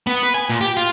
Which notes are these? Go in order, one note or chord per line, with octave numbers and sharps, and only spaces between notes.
B3
B4
G#5
A#2
G4
F4